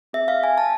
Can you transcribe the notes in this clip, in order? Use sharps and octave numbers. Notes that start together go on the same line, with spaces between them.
C4 G#4 E5
F5
G#5
A5